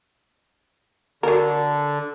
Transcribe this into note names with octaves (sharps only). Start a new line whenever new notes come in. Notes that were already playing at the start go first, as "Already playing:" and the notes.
D3 F#3 A#4